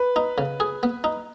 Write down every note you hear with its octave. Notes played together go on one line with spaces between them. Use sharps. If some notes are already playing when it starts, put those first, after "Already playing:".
Already playing: B4
D#4
C#3
G#4
B3
D#4